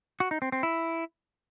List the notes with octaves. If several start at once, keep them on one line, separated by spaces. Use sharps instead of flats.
F#4
D#4
C4
C4
E4